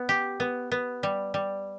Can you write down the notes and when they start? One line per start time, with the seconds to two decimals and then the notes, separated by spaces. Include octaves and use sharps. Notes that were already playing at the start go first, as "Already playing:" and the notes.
Already playing: B3
0.09 G4
0.40 B3
0.72 B3
1.03 G3
1.34 G3